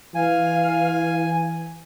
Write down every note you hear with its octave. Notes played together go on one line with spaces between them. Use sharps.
E3 F5 G#5